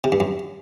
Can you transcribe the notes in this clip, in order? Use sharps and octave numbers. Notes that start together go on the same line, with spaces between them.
C3
G2
F#2